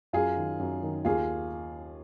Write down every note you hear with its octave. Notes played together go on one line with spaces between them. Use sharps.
F#2 F4 G#4
D#3
F#2
D#3
D#2 F4 G#4